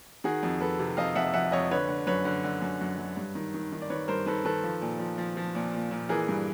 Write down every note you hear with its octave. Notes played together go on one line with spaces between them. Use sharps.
D#3 F#4 G#4
F2
F2 A4 B4
C3
F2 D#5 F5
F2 E5 F#5
F2 E5 F#5
F2 C#5 D#5
D3 B4 C#5
D3
F#2 B4 C#5
D3
D3
F#2
F#2
F#2
G2
D#3
D#3
D#3
D5
D#3 B4 C#5
G2 A#4 C5
D#3 A4 B4
D#3 A4 B4
F3
A#2
F3
F3
F3
A#2
A#2
A#2
E3 G#4 A#4
G2